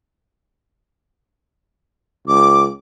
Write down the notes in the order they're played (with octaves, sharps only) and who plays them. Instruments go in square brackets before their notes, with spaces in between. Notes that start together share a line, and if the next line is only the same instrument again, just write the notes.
[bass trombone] C#2 [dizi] D6